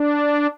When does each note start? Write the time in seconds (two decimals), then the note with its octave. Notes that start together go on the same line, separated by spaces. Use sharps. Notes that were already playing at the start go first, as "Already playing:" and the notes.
Already playing: D4